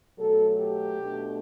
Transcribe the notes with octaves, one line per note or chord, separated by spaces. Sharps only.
B2 F#3 A3 A4
G4
B2 A3 D4